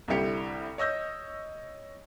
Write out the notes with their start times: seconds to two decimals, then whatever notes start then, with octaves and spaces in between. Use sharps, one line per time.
0.08 C2 D3 G3 E4 G4 C#7
0.78 C#5 D#5 E6 G6 A#6